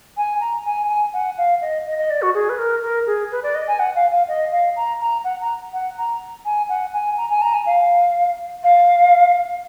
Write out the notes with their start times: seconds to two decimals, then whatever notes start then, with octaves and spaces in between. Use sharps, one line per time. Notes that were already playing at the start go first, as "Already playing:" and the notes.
0.17 G#5
0.40 A#5
0.65 G#5
0.89 G#5
1.13 F#5
1.38 F5
1.61 D#5
1.86 D#5
1.98 D#5
2.10 D5
2.22 F#4
2.34 G#4
2.49 B4
2.58 A#4
2.83 A#4
3.07 G#4
3.31 B4
3.43 D5
3.55 D#5
3.67 G#5
3.79 F#5
3.95 F5
4.11 F5
4.28 D#5
4.52 F5
4.76 A#5
5.00 A#5
5.24 F#5
5.41 A#5
5.73 F#5
5.97 A#5
6.45 G#5
6.69 F#5
6.93 G#5
7.17 A#5
7.30 G#5
7.42 A#5
7.54 G#5
7.66 F5
8.63 F5